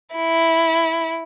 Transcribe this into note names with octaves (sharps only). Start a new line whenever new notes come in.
E4